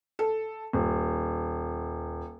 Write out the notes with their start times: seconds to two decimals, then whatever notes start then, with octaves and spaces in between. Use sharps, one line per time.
0.19 A4
0.73 D#1